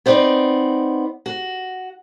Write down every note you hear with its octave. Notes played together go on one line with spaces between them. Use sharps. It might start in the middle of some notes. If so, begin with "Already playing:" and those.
B3 C4 D#4 D5
F#4